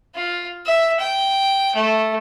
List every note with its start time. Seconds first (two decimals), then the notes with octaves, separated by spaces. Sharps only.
0.15 F4
0.66 E5
1.00 G5
1.75 A3